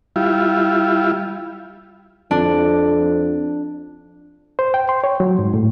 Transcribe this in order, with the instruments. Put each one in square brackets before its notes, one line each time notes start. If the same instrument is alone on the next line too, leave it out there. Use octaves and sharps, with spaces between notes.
[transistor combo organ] G3 E4 F4
[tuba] F2 [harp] D4
[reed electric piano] C5
G5
C6
C#5
F#3
G#2
A2